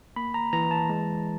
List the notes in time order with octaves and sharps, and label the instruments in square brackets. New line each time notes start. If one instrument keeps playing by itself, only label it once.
[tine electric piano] A#3 B5
A#5
E3 A#5
A5
G#3